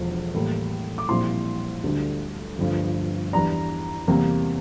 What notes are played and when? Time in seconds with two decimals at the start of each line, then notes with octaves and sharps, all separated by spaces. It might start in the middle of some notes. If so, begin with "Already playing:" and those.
Already playing: E1 E2 D3 F3
0.34 A2 E3 G3 A#3
0.98 D6
1.09 A#1 A#2 G3 C4 E4 C6
1.84 D2 D3 G3 D4
2.58 G1 G2 F3 A3
3.33 E2 E3 G3 D4 A#5
4.08 E2 C3 G3 A#3